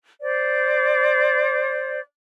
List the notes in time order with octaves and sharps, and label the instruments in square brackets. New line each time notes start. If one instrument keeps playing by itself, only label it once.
[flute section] C5 D5